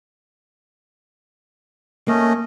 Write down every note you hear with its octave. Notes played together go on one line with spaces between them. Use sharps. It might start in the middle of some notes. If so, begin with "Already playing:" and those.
A3 A#3 C#4 D#5